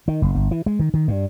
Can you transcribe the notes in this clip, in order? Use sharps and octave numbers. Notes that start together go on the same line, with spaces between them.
D#3
F#1
G1
E3
G#3
D#3
D#3
G2